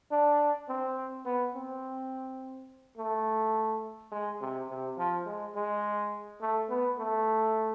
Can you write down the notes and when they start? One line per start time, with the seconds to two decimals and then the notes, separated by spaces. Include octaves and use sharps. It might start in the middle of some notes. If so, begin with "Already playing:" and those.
0.11 D4
0.69 C4
1.26 B3
1.55 C4
2.97 A3
4.12 G#3
4.41 C3
4.69 C3
4.98 F3
5.26 G#3
5.55 G#3
6.41 A3
6.69 B3
6.98 A3